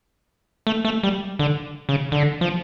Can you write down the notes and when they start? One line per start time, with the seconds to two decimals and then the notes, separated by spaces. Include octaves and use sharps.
0.67 A3
0.85 A3
1.03 G3
1.39 D3
1.89 C#3
2.12 D3
2.41 F3